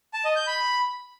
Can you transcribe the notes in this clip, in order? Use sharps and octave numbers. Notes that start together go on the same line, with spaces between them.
A5
D#5
G6
B5